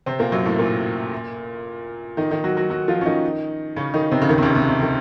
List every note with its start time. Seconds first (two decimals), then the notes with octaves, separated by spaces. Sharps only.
0.06 C3 C4
0.19 A#2 A#3
0.32 F#2 F#3
0.45 A2 A3
0.59 A#2 A#3
2.17 D#3 D#4
2.31 D#3 D#4
2.44 F#3 F#4
2.57 F#3 F#4
2.70 F#3 F#4
2.88 F3 F4
3.01 C#4
3.06 D#3 D#4
3.76 C#3 C#4
3.94 D#3 D#4
4.11 C3 C4
4.22 C#3
4.29 D#2 D#3
4.38 C3
4.42 C#2 C#3
4.55 C3
4.69 C3
4.82 D#3